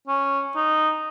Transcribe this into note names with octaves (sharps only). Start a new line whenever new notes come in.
C#4
D#4